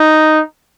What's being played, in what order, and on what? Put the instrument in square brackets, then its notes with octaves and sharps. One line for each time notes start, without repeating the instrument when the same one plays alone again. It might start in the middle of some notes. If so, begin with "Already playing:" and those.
Already playing: [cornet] D#4